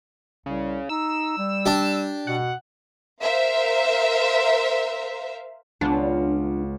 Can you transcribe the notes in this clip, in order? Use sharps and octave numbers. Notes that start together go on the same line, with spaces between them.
C2 C#3
D#4 E6
G3
D4 G4
B2 F#5
A#4 C5 E5 F5
C#2 B3 D4 F4